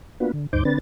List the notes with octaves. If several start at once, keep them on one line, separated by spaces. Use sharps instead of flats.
A#3 B3 D4 F4 F#4 B4
D3
D2 G2 D#4 C5 D6 G6
D3 C4 D4 B4 A6